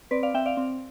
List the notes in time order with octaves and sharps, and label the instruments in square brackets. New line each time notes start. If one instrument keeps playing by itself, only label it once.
[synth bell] C4 B4 D5
D5 F5
C4 E5 G5
D5 F5
C4